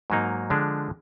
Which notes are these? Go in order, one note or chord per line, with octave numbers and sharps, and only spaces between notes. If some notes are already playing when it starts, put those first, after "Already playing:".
G#2 F#3 A#3 D#4
D3 F3 G#3 D4